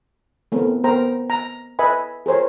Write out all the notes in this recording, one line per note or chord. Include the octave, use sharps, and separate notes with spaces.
A3 B3 C4 A#4
B3 A#4 C5 G5 A#5
A#5
B4 D#5 E5 G#5 B5
G#4 A#4 C5 C#5